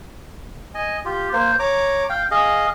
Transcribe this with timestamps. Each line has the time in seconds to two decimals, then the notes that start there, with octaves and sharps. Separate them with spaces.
0.74 D#5 G#5
1.05 F4 G4
1.33 A#3 C5
1.59 C#5 A#5 D6
2.09 F5 G5
2.31 G#4 D#5 F5